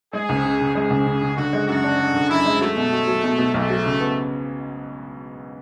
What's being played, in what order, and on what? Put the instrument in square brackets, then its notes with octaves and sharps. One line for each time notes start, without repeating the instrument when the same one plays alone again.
[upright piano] G#3 [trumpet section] G#4
[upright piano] C#2
C#3
C#3
[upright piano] G#3 [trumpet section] G#4
[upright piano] C#2
C#3
C#3
[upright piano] D3 [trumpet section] F#4
[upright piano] G#3
[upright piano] F#2 [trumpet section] F#4
[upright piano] D4
D4
D3
[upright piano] F#2 [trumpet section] E4
[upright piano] G#3
[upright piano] F#3 [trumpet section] A3
[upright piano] B2
F#3
F#3
B2
B2
[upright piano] B1 [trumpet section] A3
[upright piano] F#3
C#3
B3